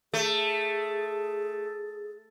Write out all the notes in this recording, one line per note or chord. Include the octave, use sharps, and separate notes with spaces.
A3 G#4